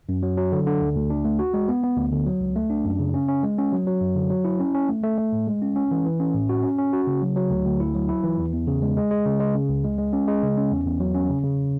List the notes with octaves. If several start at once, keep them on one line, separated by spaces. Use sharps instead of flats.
F#2
F#3
F#3
D3
D3
D2
D2
D4
A3
F#4
G#3
B3
B3
D2
D3
F#3
C#2
A3
D4
F#2
C#3
C#4
C#4
G#3
C#4
F#3
F#3
F#2
D3
F#3
E4
C#4
C#4
A3
A3
A3
A2
G#3
C#4
C#4
E3
E3
C#4
A2
F#4
C#4
C#4
F#4
C#3
F#3
F#3
D2
D2
E4
F#3
E4
E3
E2
E2
C#3
G#3
G#3
G#3
C#3
G#3
C#3
C#2
G#3
G#3
C#4
G#3
C#3
C#4
E2
E2
F#3
C#4
C#3
C#3